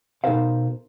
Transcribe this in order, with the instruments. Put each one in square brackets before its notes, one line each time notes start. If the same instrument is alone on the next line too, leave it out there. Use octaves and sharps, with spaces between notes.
[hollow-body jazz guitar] B2 D#4 A4 A#4 C5 F5